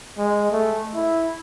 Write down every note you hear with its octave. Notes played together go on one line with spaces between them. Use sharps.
G#3
A3
E4